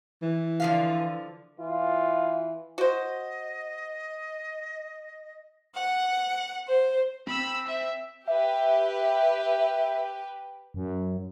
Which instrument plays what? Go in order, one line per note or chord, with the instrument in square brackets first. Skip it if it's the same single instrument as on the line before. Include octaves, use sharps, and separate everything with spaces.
[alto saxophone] E3
[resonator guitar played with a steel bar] D3 F3 F5
[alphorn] E3 [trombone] F4
[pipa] F#4 C5 [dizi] D#5
[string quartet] F#5
C5
[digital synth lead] C4 [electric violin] B5 E6
[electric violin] E5
[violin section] G4 B4 [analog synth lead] E5
[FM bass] F#2